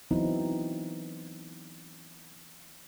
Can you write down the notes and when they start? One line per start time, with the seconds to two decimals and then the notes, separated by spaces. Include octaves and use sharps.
0.11 E3 F#3 B3 C4 D#4 E4